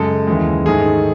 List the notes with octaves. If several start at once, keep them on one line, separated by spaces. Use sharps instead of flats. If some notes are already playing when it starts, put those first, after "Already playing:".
Already playing: F#2 C#3 G#3 A4
D#2 C#3 E3 G#3
G#2 D#3 A3 G#4